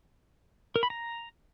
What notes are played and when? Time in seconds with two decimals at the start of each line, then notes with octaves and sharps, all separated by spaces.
0.76 A#4
0.83 B5
0.90 A#5